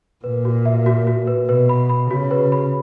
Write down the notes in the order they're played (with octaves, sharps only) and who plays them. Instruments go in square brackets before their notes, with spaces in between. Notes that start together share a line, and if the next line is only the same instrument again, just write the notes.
[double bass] A#2 [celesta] B4
[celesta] F#4
E5
F#4
F#4
B4
[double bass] B2 [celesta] B4
[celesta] B5
B5
[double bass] C#3 [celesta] F#4
[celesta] B4
B5